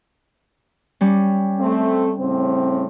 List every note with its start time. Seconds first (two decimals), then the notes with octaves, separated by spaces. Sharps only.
1.01 G3 C#4
1.60 A3 C4
2.19 A2 C#3 C4